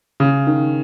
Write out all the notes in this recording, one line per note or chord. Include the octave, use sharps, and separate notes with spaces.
C#3
D#3